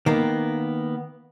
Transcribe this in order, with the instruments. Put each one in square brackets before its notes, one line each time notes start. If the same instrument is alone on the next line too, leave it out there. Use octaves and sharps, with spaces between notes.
[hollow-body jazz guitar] D#3 A#3 B3